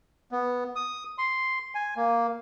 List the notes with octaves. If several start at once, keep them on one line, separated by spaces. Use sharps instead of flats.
B3
D#6
C6
G#5
A#3